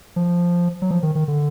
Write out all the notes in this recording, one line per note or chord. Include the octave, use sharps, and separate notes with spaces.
F3
F#3
F3
D#3
D#3
D3